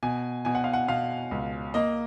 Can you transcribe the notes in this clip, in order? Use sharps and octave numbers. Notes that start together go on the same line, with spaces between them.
B2 G#5
B2 G#5
F#5
F5
F#5
B2 F5
C#2
A#3 D#5